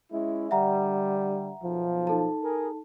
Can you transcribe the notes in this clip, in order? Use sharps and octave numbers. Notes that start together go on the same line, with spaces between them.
G#3 C#4 E4
D3 G3 E5 F#5 A#5
B1 F3
D#4 A4 A5
G#4 A#4